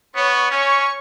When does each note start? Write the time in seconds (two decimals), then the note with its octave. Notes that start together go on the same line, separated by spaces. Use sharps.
0.16 B3 C#5 C#6
0.51 C#4 C#5 C#6